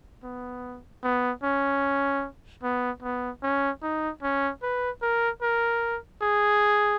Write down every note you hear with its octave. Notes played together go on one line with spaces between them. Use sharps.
B3
B3
C#4
B3
B3
C#4
D#4
C#4
B4
A#4
A#4
G#4